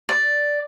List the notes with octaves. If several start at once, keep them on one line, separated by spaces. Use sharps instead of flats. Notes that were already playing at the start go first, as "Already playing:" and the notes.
D5